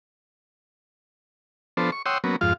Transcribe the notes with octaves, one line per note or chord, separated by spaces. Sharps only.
F3 B3 D4 A4 C5
C#6
C#5 F#5 G5 C6 D#6 E6
F#3 A#3 B3 C#4
F2 G#2 F4 F5